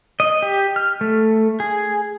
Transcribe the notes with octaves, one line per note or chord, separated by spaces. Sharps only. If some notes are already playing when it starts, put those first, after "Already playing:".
D#5
G4
F6
A3
G#4